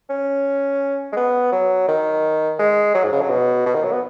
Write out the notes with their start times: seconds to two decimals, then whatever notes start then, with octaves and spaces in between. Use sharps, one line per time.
0.09 C#4
1.12 G#3
1.17 B3
1.52 F#3
1.88 D#3
2.59 G#3
2.94 F#3
3.04 G#2
3.12 C#3
3.21 F#3
3.30 B2
3.66 B2
3.75 D#3
3.83 F#3
3.92 B3